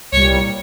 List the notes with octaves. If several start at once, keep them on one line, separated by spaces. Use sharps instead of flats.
C2 A#2 G3 C#5